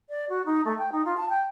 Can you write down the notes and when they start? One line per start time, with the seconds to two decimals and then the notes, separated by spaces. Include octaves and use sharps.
0.10 D5
0.30 F#4
0.46 D#4
0.65 A3
0.78 G5
0.92 D#4
1.05 F4
1.17 A5
1.30 G5